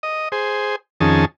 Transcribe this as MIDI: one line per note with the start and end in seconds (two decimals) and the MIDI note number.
0.03 0.29 75
0.32 0.76 68
0.32 0.76 72
1.00 1.25 41
1.00 1.25 51
1.00 1.25 61
1.00 1.25 68
1.00 1.25 81